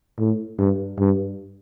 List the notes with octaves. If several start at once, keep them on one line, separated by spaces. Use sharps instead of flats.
A2
G2
G2